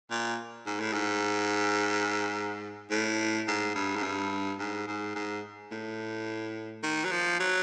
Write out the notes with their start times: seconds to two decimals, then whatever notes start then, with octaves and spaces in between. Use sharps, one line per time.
0.11 A#2
0.67 G#2
0.80 A2
0.93 G#2
2.91 A2
3.48 G#2
3.75 G2
3.96 G#2
4.03 G2
4.59 G#2
4.87 G#2
5.15 G#2
5.71 A2
6.83 D#3
7.04 F#3
7.11 F3
7.39 F#3